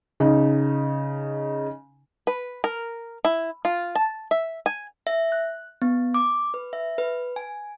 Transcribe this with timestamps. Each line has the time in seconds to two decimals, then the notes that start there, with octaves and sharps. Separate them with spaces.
0.20 C#3 D#4
2.27 B4
2.64 A#4
3.25 E4
3.65 F4
3.95 A5
4.31 E5
4.66 G#5
5.07 E5
5.32 F#6
5.82 B3
6.14 D6
6.54 B4
6.73 E5
6.98 B4
7.36 G#5